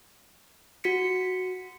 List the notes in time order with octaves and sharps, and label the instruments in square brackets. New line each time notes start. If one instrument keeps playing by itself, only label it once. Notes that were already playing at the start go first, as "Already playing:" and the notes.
[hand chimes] F#4 B6 C#7